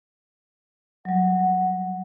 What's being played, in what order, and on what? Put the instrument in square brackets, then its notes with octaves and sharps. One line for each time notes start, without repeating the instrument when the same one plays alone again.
[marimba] F#3 G3 [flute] F#5